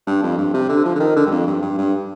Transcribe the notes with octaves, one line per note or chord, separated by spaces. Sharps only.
G2
F2
G2
C3
D3
F3
D3
D#3
D3
G2
F2
G2
G2
G2